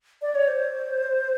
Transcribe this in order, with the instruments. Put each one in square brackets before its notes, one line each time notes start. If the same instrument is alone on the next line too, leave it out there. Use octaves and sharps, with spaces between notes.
[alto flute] D5
C#5
C5